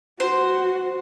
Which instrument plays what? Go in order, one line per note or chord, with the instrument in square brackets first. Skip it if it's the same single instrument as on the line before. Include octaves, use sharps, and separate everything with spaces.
[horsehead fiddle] F#4 [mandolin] C5